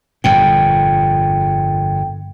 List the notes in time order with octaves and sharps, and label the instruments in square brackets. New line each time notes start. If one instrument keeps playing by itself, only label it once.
[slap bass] G1 F2 A#2 [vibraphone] G5